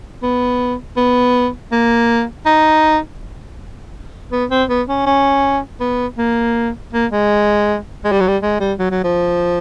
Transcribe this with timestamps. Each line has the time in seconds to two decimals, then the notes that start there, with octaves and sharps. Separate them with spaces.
0.22 B3
0.96 B3
1.72 A#3
2.46 D#4
4.32 B3
4.50 C4
4.69 B3
4.88 C#4
5.06 C#4
5.80 B3
6.18 A#3
6.93 A#3
7.11 G#3
8.04 G#3
8.12 G3
8.20 F#3
8.28 G3
8.42 G#3
8.60 G3
8.79 F#3
8.91 F#3
9.04 F3